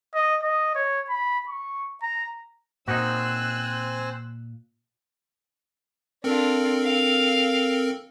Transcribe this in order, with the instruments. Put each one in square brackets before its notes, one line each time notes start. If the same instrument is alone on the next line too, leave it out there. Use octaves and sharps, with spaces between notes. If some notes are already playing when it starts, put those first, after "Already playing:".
[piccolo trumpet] D#5
D#5
C#5
B5
C#6
A#5
[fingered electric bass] A#2 [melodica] C4 C5 G#5 [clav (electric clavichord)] D#4 F#4 [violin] E6 F#6
[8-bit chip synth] C4 A4 A#4 [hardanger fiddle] D4 F4
[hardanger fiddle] F5